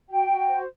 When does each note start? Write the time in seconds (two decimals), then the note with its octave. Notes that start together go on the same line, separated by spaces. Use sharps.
0.08 F#4 G5
0.28 F#4
0.48 C5